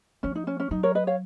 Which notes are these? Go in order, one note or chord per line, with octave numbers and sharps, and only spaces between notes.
F3 C#4
D#4
C#4
C#4
F#3 D#4
A#4 C#5
B4 D#5
C#5 F5